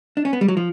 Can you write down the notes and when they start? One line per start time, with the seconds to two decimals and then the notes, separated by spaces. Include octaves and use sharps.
0.17 D4
0.25 C#4
0.33 B3
0.41 G3
0.48 F#3
0.57 F3